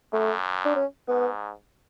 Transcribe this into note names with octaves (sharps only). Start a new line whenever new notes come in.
F#2 A3
D4
C#4
G#2 B3